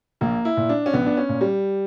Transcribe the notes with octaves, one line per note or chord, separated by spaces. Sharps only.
A#1 A#3
E4
A#2
D4
C#4
A#1 B3
D4
C#4
A#2
G3